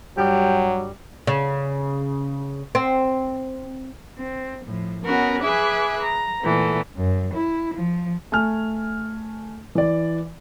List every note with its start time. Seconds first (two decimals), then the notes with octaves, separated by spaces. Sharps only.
0.18 G2 F#3 G3 G4
1.27 C#3
2.75 C4
4.18 C4
4.66 A2 F3
5.05 B3 C#4 F#4 A#4 B4
5.43 G#4 B4 E5 G#5 D6 F#6
6.03 A#5
6.41 A#2 E3 A3 B3
6.96 F#2
7.33 E4
7.74 F3
8.32 A3 G#5 F6
9.75 E3 D5